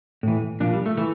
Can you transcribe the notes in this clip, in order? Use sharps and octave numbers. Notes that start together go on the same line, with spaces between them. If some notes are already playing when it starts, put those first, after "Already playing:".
A2 E3
A#2 F3 D4
G3
A3
E3 A3